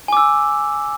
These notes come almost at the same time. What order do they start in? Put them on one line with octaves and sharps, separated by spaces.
G#5 D6 E6